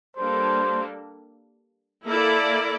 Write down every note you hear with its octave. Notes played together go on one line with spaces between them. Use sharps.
G3 A#3 D4 A4 C5
A#3 E4 A4 D5